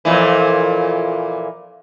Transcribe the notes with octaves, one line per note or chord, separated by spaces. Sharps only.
F2 A#2 E3